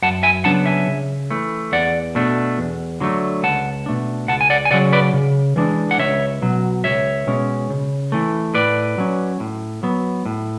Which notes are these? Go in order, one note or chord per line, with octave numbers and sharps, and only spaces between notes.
F#2 F#5 A5
E5 G#5
C#3 F#3 B3 D4 F#5 A5
E5 G#5
C#3
E3 A3
E2 D5 F#5
B2 A3 D4
E2
D3 F#3 A3
C#2 F#5 A5
B2 A3 D4
C#2 F#5 A5
G#5
D5 F#5
G#5
C#3 F#3 C#4 D5 F#5
B4 D5
C#3
E3 G#3 D4
F#5
C#2 C#5 E5
B2 F#3
C#2 C#5 E5
B2 G#3 C#4
C#3
E3 A3
A2 B4 D5
F#3 C#4
A2
F#3 B3
A2